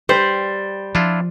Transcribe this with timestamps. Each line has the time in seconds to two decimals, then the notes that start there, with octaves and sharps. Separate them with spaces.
0.09 G3 C5
0.95 F3 D4 E4 F4